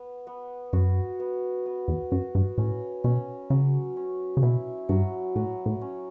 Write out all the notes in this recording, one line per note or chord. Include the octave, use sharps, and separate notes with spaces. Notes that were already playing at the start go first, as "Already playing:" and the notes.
Already playing: B3
B3
F#2 F#4
B3
B3
E2
F#2 F#4
G2
A2 C#4
B2 C#4
C#3 F#3
C#4
C#3
B2 E4
G2 F#3
A2 F#3
A2
C#4